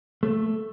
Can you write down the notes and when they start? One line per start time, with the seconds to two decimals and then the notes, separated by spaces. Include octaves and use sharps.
0.23 A3